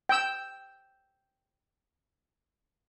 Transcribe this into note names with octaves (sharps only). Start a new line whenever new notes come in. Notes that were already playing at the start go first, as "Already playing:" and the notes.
G5 E6